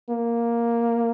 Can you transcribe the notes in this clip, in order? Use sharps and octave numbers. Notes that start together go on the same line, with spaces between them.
A#3